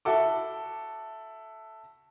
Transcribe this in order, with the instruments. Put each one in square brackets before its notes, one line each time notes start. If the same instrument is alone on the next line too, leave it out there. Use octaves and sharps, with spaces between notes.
[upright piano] E4 F#4 A4 D6